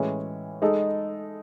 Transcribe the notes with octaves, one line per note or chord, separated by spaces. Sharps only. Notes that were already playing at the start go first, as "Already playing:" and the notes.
Already playing: A2 E3 G#3 C#4
G#3 D#4 A4